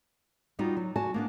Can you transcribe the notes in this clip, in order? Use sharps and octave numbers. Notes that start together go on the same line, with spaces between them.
G3 B3 D#4 F4 F#4
F#3
F#4 G#5 A5
A#3 B3 D4